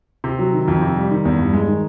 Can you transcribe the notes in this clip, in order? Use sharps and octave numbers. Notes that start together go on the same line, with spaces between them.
C3
F#3
D#3
F2
C3
G3
D#3
E2
G2
G#3
D#3